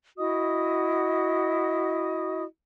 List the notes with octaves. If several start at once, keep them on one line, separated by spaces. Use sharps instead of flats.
E4 F#4 D#5 D#6